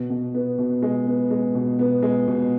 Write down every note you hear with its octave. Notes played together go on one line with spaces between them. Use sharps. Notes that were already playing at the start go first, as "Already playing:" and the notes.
Already playing: B2
B2
B3
B2
G#3
B3
G#3
B2
B3
G#3
B2